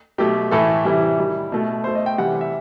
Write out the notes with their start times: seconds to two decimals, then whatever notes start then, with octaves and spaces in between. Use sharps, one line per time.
0.18 B2 F#3 A3 G4
0.51 A2 E3 A3 A4
0.85 C3 E3 G3 E4
1.19 D#3 G3
1.52 B2 A3
1.84 B2 A3 C5
1.95 D#5
2.06 G5
2.18 C3 E3 G3 F#5
2.41 E5